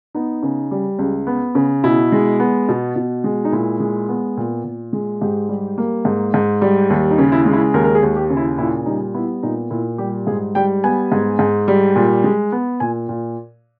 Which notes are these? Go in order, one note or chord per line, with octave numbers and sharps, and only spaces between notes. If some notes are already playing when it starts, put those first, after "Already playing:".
B3 D#4
C#3
G3
C#2
B3
C#3
B2 E4
G#3
B3
B2
B2
G#3
D#4
A#2 E4
G#3
B3
A#2
A#2
G#3
G#2 G4
G3
A#3
G#2
G#2
G3
D#2
D#4
C#3
E4
G#3
E4
D#2 A#4
A#4
G#4
D#2
G4
C#3
E4
A#2 E4
G3 D#4
B3 E4
A#2 D#4
A#2 E4
G3 G4
G#2 G#4
G3 G5
B3 G#5
G#2
G#2
G3
A#2
G#3
B3
A#2 G#5
A#2